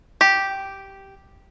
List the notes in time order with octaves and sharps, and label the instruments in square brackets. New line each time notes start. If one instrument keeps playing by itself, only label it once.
[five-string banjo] G4